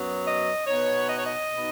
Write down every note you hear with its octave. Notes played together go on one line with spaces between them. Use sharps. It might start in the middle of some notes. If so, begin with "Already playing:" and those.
Already playing: F#2 F#3 B3
D#5
B2 B3 D#4 C#5
D#5
C#5
D#5
B2 B3 D#4